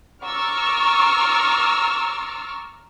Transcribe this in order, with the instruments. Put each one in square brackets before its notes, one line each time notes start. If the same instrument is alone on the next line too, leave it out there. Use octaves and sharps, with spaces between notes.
[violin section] A#5 C#6 D6 E6 F6 A6